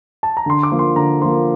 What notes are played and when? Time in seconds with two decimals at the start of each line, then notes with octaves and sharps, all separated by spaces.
0.23 A5
0.37 A#5
0.46 D3 C6
0.63 D6
0.72 F3 A#3
0.79 C6
0.96 D3 A#5
1.22 F3 A#3 C6